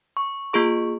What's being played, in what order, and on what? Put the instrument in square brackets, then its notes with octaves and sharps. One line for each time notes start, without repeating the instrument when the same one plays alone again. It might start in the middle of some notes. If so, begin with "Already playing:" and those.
[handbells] C#6
A#3 F4 G#4 C#6